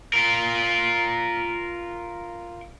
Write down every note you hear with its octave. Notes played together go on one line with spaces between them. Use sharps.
F4 A#4